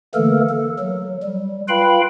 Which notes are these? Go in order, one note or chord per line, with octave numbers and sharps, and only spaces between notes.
D3 E3 A3 A#3 A4 A#4
A4
F#3
G3
F4 B4 F5 G5 B5